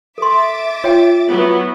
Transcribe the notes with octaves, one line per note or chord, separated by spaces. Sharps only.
A4 E5 C6 D6 A6
F4 C#5 G5
F#3 B3 E4